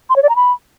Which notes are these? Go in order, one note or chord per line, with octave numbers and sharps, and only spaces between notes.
C6
C#5
D5
A#5
B5